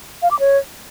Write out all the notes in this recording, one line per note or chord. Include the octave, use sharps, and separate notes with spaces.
F5
D6
C#5